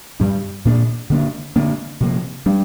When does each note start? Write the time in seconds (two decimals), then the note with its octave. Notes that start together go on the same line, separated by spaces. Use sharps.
0.20 G2 G3 D4
0.65 A#2 A#3 D4
1.10 D3 A#3 D4
1.56 D3 A#3 D4
2.00 C3 F3 A#3
2.46 G3 D4